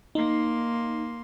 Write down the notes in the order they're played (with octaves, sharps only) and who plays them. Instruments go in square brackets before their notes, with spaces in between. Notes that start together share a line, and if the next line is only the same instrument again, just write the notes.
[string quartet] A#3 C6 [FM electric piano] D#4